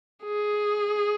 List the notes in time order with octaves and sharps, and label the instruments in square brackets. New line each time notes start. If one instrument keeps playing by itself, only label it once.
[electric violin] G#4